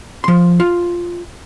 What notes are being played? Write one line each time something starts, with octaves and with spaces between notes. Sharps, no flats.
F3 C6
F4